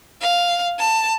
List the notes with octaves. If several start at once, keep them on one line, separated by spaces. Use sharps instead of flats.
F5
A5